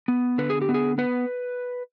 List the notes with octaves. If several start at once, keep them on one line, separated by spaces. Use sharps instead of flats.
B3
D3 B4
G#4
G4
B3
G#4
B3 B4